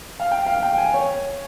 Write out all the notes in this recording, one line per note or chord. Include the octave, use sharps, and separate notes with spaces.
F5
G5
F5
G5
G#5
C#5